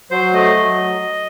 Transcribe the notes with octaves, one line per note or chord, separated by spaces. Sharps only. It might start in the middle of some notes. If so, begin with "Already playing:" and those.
F#3 C5
A3 D#5
F#3